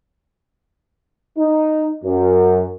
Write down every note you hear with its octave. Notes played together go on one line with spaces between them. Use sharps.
D#4
F#2